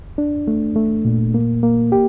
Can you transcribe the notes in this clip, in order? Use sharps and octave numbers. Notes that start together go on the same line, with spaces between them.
D4
A3
A3
A#2
A#3
A#3
G4